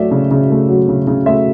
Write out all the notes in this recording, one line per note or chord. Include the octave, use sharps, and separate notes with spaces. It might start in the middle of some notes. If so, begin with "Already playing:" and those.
Already playing: F#3 A3 D5 E5
C#3
C#3
A3
F#3
C#3
C#3
A3 E5